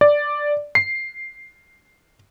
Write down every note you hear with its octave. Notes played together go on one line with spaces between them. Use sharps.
D5
C7